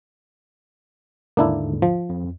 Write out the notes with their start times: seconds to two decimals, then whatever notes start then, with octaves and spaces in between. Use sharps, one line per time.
1.37 D#2 G#2 D3 A#3 D4 E4
1.82 F3
2.09 F2